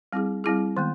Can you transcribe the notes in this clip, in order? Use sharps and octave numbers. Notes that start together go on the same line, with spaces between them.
G3 C4 E4 G#4
G3 C4 E4 G#4
D#3 G#3 B3